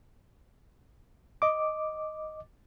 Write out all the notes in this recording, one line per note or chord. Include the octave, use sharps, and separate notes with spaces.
D#5 D6